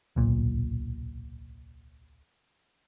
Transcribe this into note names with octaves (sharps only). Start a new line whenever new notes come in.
D1 B1 A#2